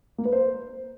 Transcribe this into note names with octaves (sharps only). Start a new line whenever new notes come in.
A#3
B4
C5